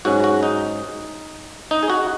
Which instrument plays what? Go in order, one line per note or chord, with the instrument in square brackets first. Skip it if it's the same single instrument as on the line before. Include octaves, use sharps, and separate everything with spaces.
[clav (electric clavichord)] G#2 F#3 C#4 F#4
F#4
D#4
D#4
G#4
F#4